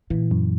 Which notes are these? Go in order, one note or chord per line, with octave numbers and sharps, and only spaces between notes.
A#2 E3
F#2